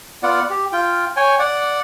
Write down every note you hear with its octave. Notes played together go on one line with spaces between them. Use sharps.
B3 F4 D5 F#5
G4
F4 G5
C#5 G5 G#5
D5 F#5